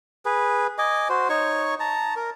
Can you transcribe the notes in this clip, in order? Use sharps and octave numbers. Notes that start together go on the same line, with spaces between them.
G#4 B4
D#5 G#5 D6
F#4 C5
D#4 C#5 C#6
A5 A#5
A#4